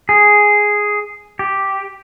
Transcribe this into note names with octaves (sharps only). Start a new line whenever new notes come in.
G#4
G4